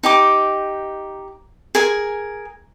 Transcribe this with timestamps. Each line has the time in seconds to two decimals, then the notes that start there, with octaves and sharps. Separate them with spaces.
0.03 D#4 G4 D6
1.75 G#4 A#4 G#5